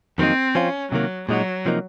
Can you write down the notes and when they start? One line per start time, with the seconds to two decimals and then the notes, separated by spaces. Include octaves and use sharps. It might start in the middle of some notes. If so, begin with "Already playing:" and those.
0.18 F2 D#3 F#3 A#3 C4 D#4
0.55 F3 C4 C#4 F4
0.92 C3 D#3 F#3 A#3
1.29 A#2 F#3 G#3 D#4 F#4
1.65 C3 F3 A#3 D#4